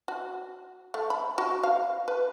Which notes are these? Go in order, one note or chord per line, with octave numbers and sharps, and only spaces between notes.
F#4
A3
B5
F#4
F5
B4